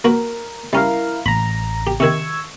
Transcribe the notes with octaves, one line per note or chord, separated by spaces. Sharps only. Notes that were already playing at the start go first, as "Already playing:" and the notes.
A#3 F#4 A#4 B4
G3 C#4 E4 A#4 F5
A1 A#5 B5
G4
C3 D#3 C#6 E6 G#6